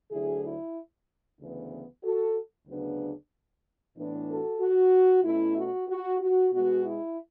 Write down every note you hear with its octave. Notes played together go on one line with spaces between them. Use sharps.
D2 D3 F#3 E4 G#4
E4
D2 C#3 E3 B3
F#4 A4
D2 C#3 F#3 B3 D4
A2 E3 B3 D4
F#4 A4
F#4
B2 A3 C#4 E4
F#4
F#4
F#4
B2 G#3 B3 F#4
E4